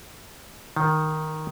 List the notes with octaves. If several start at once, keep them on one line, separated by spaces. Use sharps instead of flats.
D#3